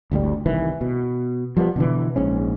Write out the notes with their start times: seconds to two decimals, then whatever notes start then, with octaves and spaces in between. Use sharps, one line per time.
0.11 G1 D2 A2 G3
0.46 C2 D#3 E3
0.81 B2
1.57 F3 G3 A3 B3
1.76 B2 D3 E3
2.16 A#1 G#2 C#4